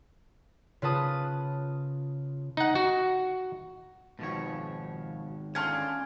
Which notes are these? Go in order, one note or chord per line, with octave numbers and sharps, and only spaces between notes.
C#3 F4 B4 A5 D#6 F#6
D#4 F#5
F#4
G#2 B2 D#3 F3 C#5
D3 C#4 F4 G5 A5 F6 G#6